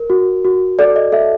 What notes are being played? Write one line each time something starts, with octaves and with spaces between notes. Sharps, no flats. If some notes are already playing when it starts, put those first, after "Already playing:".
Already playing: A#4
F#4
F#4
A4 D5
D#5
A4 E5